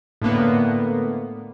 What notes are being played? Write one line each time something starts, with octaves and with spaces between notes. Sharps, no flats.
A2 D3 A#3 B3